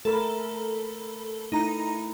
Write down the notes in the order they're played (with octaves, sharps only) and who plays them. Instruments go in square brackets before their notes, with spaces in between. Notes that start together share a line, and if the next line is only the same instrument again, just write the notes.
[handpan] A3 A#4 [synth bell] A4 B5
[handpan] A3 E4 [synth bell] D#4 A#5